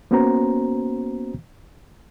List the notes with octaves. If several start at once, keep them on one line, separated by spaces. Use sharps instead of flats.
A#3 B3 C#4 F#4 C5 A#5